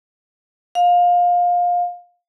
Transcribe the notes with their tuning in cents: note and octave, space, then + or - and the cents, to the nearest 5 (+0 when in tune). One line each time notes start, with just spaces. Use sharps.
F5 +20